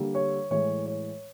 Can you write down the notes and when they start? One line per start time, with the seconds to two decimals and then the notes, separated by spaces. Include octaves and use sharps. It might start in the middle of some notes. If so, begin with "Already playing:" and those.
Already playing: D3 G3 A#3
0.15 C#5
0.50 A2 E3 G#3 C#5
0.86 C#5